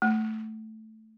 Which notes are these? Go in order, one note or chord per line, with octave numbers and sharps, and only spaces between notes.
A3